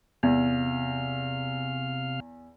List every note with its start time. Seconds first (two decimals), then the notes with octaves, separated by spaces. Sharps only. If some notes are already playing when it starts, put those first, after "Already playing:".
0.23 E2 C3 F5 F6